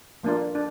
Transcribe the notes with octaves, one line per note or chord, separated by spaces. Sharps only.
F3 A#3 D4 F4
D4